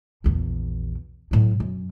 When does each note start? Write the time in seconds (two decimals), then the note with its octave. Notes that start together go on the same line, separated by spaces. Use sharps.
0.24 A#1 E2
1.31 A2 F#3
1.60 F#2